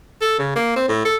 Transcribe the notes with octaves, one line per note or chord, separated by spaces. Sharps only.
A4
C#3
A#3
C4
A2
A4